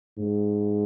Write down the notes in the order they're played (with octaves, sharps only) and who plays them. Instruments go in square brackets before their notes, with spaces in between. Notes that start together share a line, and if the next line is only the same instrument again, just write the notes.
[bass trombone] G#2